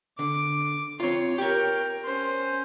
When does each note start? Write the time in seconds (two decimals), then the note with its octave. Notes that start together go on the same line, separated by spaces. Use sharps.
0.19 D3 D6
1.00 C4 F4 C#5
1.38 G4 A#4 C#5 G5
2.04 C#4 C5